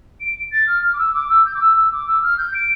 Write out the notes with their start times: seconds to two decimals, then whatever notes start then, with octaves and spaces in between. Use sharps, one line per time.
0.20 D7
0.51 A6
0.67 F6
0.82 F6
0.93 D6
0.98 E6
1.13 D6
1.29 E6
1.45 G6
1.54 D6
1.60 E6
1.76 E6
1.92 D6
2.07 E6
2.22 F6
2.37 G6
2.54 D7